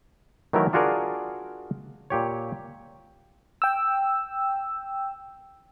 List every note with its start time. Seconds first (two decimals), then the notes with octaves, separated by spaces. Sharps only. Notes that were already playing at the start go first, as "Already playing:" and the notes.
0.53 D#3 E3 F#3 A3 E4 A#4
0.73 D4 F4 F#4 G#4 A#4 D5
2.10 A#2 G4 C#5
3.62 G5 E6